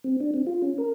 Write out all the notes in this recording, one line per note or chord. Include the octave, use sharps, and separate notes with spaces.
C4
D4
C4
F4
C#4
A#4